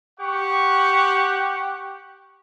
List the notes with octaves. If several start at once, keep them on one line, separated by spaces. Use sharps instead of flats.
G4 F#5 C#6